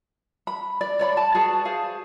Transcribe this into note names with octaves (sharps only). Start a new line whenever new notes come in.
B5
D5
C#5 D5 B5
A5
F#4 G#4 B4 A5
G#4 C5 F5